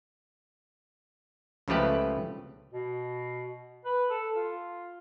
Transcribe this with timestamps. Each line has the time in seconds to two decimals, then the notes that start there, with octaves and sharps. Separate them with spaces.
1.68 C#2 C#3 F3 A3 G4 B4
2.73 B2
3.85 B4
4.10 A4
4.36 F4